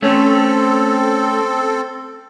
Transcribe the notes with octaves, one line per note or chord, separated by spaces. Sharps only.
A3 C4 C#4 A4